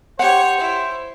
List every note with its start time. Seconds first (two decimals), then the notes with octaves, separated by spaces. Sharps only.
0.19 G4 C5 C#5 F#5
0.60 E4